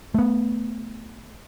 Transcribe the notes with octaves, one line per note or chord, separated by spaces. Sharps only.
A3 B3